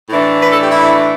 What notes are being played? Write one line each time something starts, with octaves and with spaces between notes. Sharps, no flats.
A2 E3 A3 D4
B4
A4
G4
E4